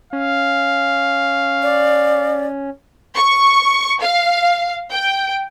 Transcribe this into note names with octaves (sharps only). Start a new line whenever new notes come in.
C#4 F5
D5
C#6
F5
G5